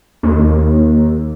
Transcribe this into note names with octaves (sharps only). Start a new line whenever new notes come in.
D#2